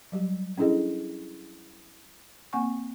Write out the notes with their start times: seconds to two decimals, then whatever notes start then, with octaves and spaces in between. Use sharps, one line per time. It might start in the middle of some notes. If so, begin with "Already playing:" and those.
0.12 F#3 G3 G4
0.57 C#4 D4 E4 G#4 A4 D#5
2.53 A#3 C4 F#5 G#5 C#6